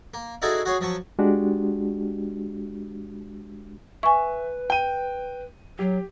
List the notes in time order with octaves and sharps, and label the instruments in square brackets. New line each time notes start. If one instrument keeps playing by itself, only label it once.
[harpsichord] A#3
D#4 E4 F#4 G#4 A4 D5
F#4 G#4 C#5 F5
F3 F#3 A5 C#6
[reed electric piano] G#3 D4 F#4 G4
[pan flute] B4 [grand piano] E5 [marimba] G#5 C#6
[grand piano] G5 D#7
[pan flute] F#3 [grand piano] G4